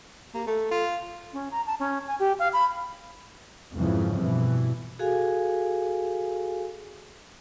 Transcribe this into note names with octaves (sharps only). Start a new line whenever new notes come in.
A#3 G4
A3 A4
F4
C#4
A#5
A5
C#4
G#5
G4
F5
B5
F2 G#2 C#3 E3 F3
G2 B2 E3
F#4 G#4 A4 F5 G#5